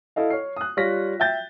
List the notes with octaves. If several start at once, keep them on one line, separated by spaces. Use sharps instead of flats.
E4 A4 D#5 F5
C#5 F6 C7
D#6 F#6
G3 F4 C#5 F6 A#6 B6
E5 G5 G6 A6